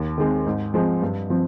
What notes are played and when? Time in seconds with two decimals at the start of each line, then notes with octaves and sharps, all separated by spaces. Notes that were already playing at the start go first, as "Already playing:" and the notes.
Already playing: D#2
0.18 D#3 G#3 C4
0.47 G#2
0.74 F3 G#3 C4
1.02 G2
1.30 F3 C4